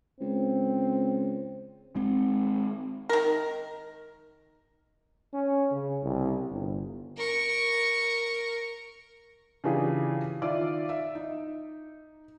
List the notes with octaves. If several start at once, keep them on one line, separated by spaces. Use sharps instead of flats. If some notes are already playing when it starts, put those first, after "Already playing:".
C#2 C4
G#3 C4
D#3 A#4
C#4
C#3
C2
G1
A#4 C#6
C#3 E3 D4 F4 G4 G#4
D#3 F4 D5 E5
E5
D#4